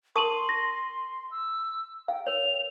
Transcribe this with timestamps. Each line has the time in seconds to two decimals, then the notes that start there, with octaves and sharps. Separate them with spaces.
0.16 A#4 A5 C6 C#6 D#6 D#7 F#7
0.49 A#6
1.31 E6
2.08 F5 G5
2.27 A#4 C#5 F7